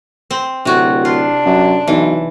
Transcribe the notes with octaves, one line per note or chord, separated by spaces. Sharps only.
C4
D1 C3 F#4
D4 F4
F#2
B1 E3